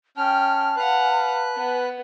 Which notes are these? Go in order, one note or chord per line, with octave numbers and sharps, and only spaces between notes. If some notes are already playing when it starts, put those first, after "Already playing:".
C#4 G5 A5 F6
B4 F5 F#5 F#6
B3